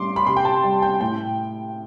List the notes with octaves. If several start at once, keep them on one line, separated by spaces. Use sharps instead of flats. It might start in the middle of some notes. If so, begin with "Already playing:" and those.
Already playing: A2 G3 C6 D6
B5
C3 C6
G5
A5
G3
G5
A2 G5